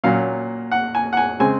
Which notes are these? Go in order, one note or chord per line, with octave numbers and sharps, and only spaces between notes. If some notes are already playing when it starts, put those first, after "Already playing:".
A#2 F#3 C#4 F5
F#5
G#5
F#5
G#5
C#3 G#3 C4 G#5